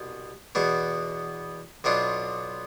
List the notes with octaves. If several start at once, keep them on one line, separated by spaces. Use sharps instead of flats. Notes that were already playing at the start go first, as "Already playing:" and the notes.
Already playing: C2 B2
E2 B2 B3 E4
B1 B2 B3 D4 F4